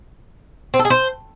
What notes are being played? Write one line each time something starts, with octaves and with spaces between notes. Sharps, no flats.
C4
A4
G#4
C5